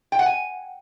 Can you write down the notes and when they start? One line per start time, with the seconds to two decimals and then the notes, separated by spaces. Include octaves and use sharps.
0.12 G5
0.19 F#5
0.26 G#5